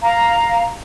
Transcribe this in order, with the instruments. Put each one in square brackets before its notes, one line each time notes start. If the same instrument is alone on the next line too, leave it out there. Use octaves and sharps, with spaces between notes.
[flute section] F5 A#5